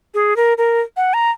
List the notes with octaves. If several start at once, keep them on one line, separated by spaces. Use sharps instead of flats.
G#4
A#4
A#4
F#5
A#5